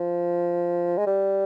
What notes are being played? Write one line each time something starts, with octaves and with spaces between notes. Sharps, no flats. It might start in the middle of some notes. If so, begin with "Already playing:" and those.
Already playing: F3
G#3
G3